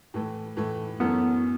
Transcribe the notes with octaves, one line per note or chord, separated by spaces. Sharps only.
A2 E3 A3
A2 E3 A3
F#2 E3 A3 B3 C#4